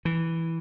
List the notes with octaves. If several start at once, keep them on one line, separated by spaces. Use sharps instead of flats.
E3